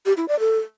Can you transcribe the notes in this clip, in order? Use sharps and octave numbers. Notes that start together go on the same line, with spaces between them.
G4
E4
D5
A4